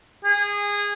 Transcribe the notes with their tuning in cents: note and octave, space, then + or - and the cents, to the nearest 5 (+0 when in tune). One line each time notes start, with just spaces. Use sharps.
G#4 -20